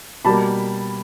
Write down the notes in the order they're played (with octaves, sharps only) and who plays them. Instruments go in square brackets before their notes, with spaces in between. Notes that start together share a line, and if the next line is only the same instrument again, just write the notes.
[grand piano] B2 G3 A#3 A5 B5